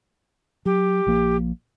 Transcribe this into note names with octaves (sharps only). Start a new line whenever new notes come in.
F#3 G4
A#1 F3 A#3